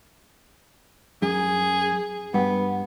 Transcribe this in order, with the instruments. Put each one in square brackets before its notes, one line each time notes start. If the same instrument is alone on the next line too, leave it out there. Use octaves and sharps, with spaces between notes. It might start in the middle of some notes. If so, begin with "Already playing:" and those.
[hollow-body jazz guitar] F#2 [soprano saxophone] G#4
[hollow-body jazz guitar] G2 [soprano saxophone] B3